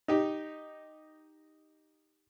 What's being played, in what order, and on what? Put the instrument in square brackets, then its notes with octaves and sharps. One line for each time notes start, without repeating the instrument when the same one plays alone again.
[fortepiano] D#4 G4